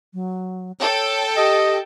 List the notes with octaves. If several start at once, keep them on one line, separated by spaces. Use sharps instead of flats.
F#3
A4 C#5 G5
G4 D#5